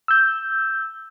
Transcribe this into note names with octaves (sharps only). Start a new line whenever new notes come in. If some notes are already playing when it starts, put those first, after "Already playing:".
E6 G6